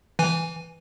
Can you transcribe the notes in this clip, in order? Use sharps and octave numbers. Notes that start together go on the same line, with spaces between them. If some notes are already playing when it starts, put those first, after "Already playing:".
E3 G#5